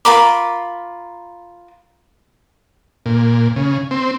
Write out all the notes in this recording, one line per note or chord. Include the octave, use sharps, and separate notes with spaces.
F4 A#4 B5 D6
A#2
C#3
C4